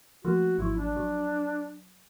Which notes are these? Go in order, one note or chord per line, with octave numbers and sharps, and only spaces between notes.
F3 A3 A#3 F#4
G#1 F3 F#3 E4
D4
F#3